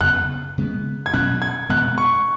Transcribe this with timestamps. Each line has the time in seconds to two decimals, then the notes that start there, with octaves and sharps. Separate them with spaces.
0.01 F#2 C#3 B3 F#6
0.58 C#3 G#3 B3
1.06 G#6
1.14 B2 F#3 C#4 F#6
1.42 G#6
1.70 B2 G#3 B3 F#6
1.98 C#6